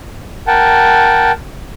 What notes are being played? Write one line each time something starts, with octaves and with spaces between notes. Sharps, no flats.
A#4 F#5 G5 A5